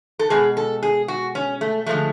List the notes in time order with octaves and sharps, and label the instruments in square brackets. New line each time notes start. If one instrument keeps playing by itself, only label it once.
[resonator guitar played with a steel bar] A4
B2 G#3 G#4
A4
G#4
F#4
C#4
A3
D3 F3 G#3 A3